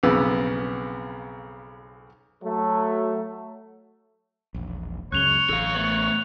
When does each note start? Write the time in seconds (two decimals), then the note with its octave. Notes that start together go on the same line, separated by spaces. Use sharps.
0.03 B1 F2 C#3 B3 E6
2.43 F#3 A3
4.54 E1 A#1
5.12 C#2 F#2 C#3 C#5 F#6 F7 G7
5.50 A1 A4 F5
5.75 A3 B3 F#7